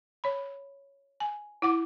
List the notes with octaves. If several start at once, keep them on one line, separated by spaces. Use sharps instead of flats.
C#5 B5
G#5
E4 F#5 D6